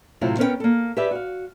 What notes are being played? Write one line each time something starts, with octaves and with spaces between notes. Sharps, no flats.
A2 C3 F#3 C4 E4 F4
B3 C#4 A#4 B4 D5 G5
A#3 A4
G4 G#4 B4 D5 E5
F#4 F5